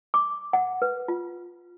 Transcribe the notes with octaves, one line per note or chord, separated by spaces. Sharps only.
D6
F#5
B4
F4